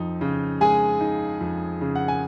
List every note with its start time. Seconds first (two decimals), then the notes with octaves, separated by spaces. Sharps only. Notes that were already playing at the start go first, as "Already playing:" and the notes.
Already playing: F2 D#4
0.21 C#3
0.61 G#3 G#4 G#5
1.01 D#4
1.41 F2
1.81 C#3
1.95 F#5
2.08 G#5